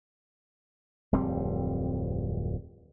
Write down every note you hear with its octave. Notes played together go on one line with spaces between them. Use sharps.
D1 F2 G3 C4